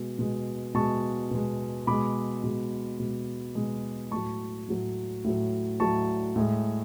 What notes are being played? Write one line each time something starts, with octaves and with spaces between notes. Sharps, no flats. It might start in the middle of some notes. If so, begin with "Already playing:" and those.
Already playing: B2 G#3
B2 G#3
B2 G#3 A5 C#6
B2 G#3
B2 G#3 B5 D6
B2 G#3
B2 G#3
B2 G#3
A2 F#3 A5 C#6
A2 F#3
A2 F#3
A2 F#3 A5 C#6
A2 G#3